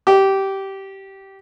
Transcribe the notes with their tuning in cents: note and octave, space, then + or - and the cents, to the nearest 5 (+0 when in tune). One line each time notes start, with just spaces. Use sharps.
G4 -15